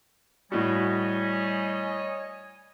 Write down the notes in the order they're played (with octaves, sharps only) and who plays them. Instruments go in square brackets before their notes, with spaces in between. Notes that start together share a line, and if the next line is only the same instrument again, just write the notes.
[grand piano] A2 F#4 [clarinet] G3 [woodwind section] C#5 D#5 G#5